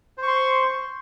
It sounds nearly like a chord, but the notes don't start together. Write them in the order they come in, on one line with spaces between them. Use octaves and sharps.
C5 C#6 C6